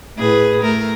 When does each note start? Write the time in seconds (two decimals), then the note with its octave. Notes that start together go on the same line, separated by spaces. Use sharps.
0.16 A2 G#4 B4
0.62 A3 A#4